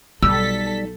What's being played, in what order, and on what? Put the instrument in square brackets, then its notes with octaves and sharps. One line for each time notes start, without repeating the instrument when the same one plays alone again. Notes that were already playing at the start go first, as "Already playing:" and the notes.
[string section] B1 A4 B6 [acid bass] G3 [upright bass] D#4 [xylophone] E6